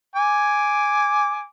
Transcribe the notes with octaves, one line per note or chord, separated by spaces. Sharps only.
G#5 D6